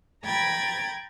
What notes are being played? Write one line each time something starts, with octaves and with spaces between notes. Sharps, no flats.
G5 A#5 B5 G#6 A6